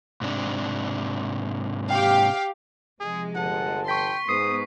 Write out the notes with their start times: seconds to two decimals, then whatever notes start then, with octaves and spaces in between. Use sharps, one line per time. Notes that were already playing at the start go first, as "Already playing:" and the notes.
0.21 G#2 C3 D4
1.91 G4 F5 G5
3.00 C3 F3 G#3 G#4
3.35 G1 F#5 A5
3.88 G5 C6 C#6 B6
4.29 G#2 B3 D#6 C7